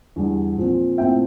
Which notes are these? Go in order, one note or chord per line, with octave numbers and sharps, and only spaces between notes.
E2 D3 G3
A#2 F3 C4
A#2 A3 C4 E4 E5 G5